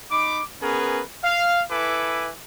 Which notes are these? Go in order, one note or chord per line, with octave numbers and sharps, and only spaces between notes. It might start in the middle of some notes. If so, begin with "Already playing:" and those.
D#4 B5 D6
B3 C#4 G#4 A#4 B4
F5
E4 A4 B4 G#5 D6